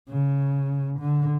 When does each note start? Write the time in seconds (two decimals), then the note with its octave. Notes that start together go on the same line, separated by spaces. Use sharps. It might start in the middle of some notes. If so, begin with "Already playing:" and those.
0.09 C#3
0.99 D3